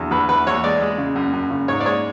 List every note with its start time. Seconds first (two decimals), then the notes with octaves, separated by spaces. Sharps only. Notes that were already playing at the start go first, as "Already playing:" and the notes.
Already playing: E2 D3 F#3
0.11 E2 B4
0.29 E2 B4
0.47 E2 C#5
0.64 G#3 D5
0.81 G#3
0.98 C#3
1.16 F#2
1.33 F#2
1.50 C#3
1.68 G#2 C#5
1.80 D5
1.86 G#3 C#5